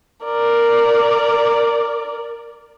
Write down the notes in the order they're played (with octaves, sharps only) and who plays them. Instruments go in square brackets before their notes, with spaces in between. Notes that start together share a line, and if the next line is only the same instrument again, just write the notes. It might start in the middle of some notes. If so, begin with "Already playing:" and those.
[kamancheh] A#4 D5